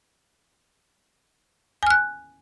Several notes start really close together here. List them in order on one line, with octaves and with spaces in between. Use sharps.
G#5 F6 F#6